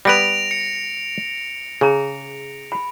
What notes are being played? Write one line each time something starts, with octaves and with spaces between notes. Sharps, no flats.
G3 B3 B4 A#6 D7 F7
C#7
C#3 G#4 A#5
B5